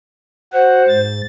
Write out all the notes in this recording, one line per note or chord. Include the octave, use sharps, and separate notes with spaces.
F#4 C5 F#5
G#2 A6